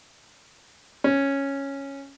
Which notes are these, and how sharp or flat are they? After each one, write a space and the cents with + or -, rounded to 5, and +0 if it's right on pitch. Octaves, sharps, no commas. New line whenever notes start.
C#4 -5